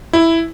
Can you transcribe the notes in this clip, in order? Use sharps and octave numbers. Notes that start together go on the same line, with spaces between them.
E4